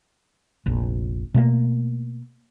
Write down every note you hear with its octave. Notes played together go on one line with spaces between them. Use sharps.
F1 A#1
B2 A3 A#3